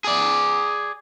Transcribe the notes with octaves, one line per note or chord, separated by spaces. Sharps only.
G#4 D5